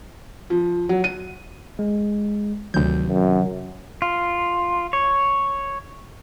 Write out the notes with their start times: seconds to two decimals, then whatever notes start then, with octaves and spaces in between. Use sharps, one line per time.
0.50 F3
0.89 F#3
1.04 D#7
1.79 G#3
2.74 D2 C3 D#3 F#3 G6
3.08 F#2
4.02 F4
4.93 C#5